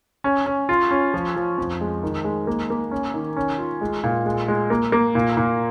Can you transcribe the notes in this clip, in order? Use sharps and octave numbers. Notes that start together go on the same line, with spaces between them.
C#4
C#4
F4
C#4
F3
F3
F2
G#3
D#3
G#3
A#3
A#3
C#4
D#3
C#4
F4
G#3
A#2
G#3
G#3
A#3
A#3
A#2
A#2